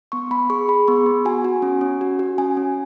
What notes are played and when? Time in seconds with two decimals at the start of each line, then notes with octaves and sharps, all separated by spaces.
0.12 B3 C#6
0.31 B3 B5
0.50 G#4 C#6
0.68 G#4 B5
0.88 B3 C#6
1.06 B3
1.25 F#4 G#5
1.44 F#4
1.62 C#4
1.81 C#4
2.01 F#4
2.19 F#4
2.38 C#4 G#5
2.57 C#4